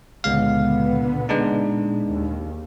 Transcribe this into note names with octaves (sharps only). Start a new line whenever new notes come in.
C#2 A#2 D3 G#3 B3 F5
G#3 D4 D#4
D#2